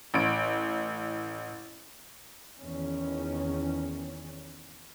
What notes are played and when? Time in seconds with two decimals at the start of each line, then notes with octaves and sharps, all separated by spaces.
0.14 A1 D7
2.61 E2 D#3 C#4